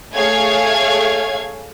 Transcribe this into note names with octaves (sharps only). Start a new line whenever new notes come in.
A3 G#4 C#5 F5 G#6